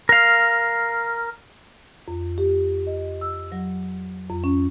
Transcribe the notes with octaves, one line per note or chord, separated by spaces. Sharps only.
A#4 F5
F2
G4
D#5
E6
F#3
F2
C#4